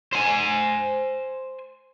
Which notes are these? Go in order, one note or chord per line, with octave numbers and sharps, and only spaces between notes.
C5 G#5